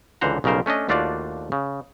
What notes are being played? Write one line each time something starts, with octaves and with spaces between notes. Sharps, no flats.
C#2 D3 E3 C5 F#5 A#5
B1 C#3 G3 A#4 C5
A3 C#4 D4 D#5
D#2 A3 D4 F4 F#4 D5
C#3